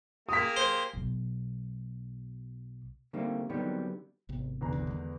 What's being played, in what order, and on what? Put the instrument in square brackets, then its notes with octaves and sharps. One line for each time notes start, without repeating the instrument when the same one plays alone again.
[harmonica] A#3 G4 G#4 [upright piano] D#6 B6
[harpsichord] C5
[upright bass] B1 B2
[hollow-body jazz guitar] D3 D#3 G3 A3 A#3 C4
D3 D#3 F#3 G3 B3 C4
[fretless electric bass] G#1 C3 B3
[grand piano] E2 D3 A#5
[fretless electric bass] G#1 C3 D4
D#3 G#3 B3